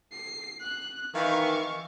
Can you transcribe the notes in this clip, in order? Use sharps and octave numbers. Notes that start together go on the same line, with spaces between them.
C7
F#6
D#3 E3 F5 C#6